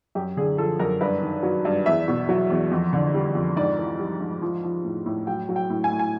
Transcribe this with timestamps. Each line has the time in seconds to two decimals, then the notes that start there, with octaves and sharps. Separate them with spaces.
0.15 F#2 G4
0.37 D3 G#4
0.58 F3 A4
0.79 F#2 A#4
1.01 G2 B4
1.22 D#3
1.43 F#3
1.65 G2
1.86 E2 E5
2.08 B2
2.29 F#3
2.50 E2
2.72 F2
2.93 D3
3.14 G3
3.35 F2
3.56 G#2 D5
3.78 E3
4.00 G3
4.21 G#2
4.42 F3
4.63 F3
4.84 A2
5.06 A2
5.27 F#3 G5
5.49 F#3
5.56 G5
5.70 A2
5.84 G#5
5.91 A2
5.99 G#5